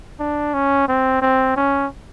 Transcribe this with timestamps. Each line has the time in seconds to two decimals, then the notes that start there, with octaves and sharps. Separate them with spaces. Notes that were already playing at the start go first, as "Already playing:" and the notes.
0.20 D4
0.54 C#4
0.88 C4
1.22 C4
1.56 C#4